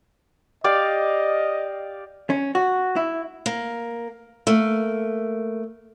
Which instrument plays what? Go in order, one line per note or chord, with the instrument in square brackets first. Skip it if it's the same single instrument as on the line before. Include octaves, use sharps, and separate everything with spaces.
[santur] G4 D5 F5 [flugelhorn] D#5
[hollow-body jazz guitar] C#4
F#4
E4
[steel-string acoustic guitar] A#3
A3 A#3